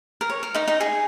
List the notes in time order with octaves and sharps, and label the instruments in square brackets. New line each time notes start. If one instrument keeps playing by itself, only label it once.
[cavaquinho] A#4
C#5
A#4
D#4 D#5
D#4 D#5
G#4 G#5